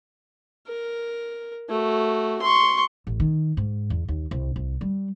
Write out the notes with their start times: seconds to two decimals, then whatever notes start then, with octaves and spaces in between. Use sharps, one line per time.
0.68 A#4
1.70 A3 F#4
2.42 C6 C#6
3.07 A1
3.20 D#3
3.57 G#2
3.90 E2
4.08 D#2
4.31 C2
4.56 C2
4.81 G3